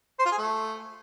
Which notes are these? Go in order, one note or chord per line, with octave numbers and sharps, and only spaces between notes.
C5
F4
G#4
A3